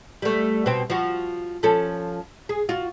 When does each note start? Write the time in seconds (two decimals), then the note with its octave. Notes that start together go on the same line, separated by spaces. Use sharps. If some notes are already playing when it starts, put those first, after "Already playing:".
0.22 G3 A3
0.66 B2 C4
0.90 F3 F#4
1.63 F3 C#4 A4
2.49 G#4
2.69 F4 F#4